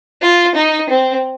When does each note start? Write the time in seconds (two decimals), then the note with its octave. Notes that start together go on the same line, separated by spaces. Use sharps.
0.22 F4
0.55 D#4
0.90 C4